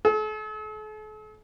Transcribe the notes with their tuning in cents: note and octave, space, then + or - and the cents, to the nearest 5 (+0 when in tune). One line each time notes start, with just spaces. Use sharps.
A4 -45